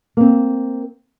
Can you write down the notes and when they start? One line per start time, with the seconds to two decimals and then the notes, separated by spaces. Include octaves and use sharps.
0.17 A#3 C4